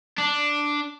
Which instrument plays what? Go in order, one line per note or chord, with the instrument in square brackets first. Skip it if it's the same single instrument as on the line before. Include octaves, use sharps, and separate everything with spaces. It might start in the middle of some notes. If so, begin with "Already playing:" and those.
[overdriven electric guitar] D4